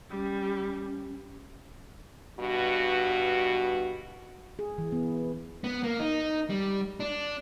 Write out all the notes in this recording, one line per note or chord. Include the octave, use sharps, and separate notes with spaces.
G3 C#4
G2 B2 F#4
G#4
E3
B3
B3
A#3
D#4
G3
D4